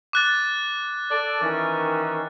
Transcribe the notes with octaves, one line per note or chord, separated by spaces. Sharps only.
D6 F#6 A6
A4 D5
D#3 E3 C#4